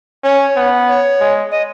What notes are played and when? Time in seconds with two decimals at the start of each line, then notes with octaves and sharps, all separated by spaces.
0.24 C#4 C#5
0.56 B3
0.89 C#5
1.20 G#3
1.51 D#5